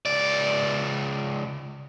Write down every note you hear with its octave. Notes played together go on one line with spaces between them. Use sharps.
C#2 D5